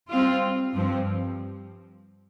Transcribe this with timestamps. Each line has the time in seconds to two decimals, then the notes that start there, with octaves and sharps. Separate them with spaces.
0.11 G3 C4 F4
0.75 G2 F3 C4